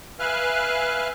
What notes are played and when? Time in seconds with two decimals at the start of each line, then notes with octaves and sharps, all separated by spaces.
0.20 B4 E5 F5 G#5 F6 F#6